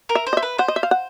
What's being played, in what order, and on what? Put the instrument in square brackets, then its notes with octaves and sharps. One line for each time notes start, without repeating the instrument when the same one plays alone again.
[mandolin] A#4
[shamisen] E5
[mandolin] C5
[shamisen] D#5
E5
[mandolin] B4
[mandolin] C5 [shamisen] F#5
[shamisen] D#5
E5
F5
F#5